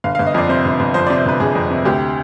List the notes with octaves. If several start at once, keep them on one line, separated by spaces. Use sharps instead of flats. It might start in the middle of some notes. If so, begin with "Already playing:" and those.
G1 F5
G1 F5
D#5
F2 D5
C3 C5
G1
G1
F2 C5
C3 D5
C5
G1 B4
G1 G#4
F2
C3
D2 G4